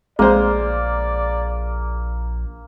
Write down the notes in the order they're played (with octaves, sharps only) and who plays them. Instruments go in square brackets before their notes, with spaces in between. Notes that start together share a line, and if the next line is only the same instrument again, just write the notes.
[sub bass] A#1 [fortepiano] G#3 C5 [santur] A#3 [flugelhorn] D5